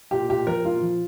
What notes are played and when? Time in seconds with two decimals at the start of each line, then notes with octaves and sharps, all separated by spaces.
0.11 A#2 G4
0.29 A#2 G4
0.47 F3 A#4
0.65 A#2 F4
0.82 F3